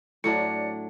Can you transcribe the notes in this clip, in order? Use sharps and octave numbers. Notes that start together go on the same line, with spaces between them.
A2 F#3 D4 D5 C#7